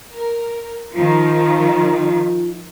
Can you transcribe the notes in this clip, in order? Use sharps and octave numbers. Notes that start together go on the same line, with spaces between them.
A#4
D#3 F3 F4